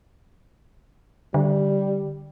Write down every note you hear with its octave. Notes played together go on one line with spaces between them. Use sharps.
D3 G3